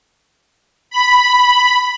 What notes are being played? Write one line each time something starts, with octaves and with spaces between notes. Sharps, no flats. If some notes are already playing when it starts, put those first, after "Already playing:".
B5